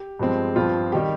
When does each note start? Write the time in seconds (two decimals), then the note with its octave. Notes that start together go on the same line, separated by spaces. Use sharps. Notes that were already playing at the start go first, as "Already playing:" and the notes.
Already playing: G4
0.19 G2 F3 G#3 C4
0.56 G2 F3 C4 F4
0.92 D#3 G3 G4